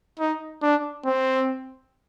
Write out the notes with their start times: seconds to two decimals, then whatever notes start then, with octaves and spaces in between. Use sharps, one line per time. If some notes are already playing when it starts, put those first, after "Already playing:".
0.19 D#4
0.63 D4
1.06 C4